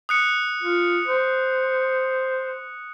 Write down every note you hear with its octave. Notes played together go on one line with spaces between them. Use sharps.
D#6 F#6 C#7
F4
C5